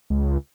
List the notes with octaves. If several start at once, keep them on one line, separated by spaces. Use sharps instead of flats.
C#2